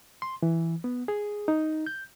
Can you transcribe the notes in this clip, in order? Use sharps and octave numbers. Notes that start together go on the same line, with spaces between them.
C6
E3
B3
G#4
D#4
G6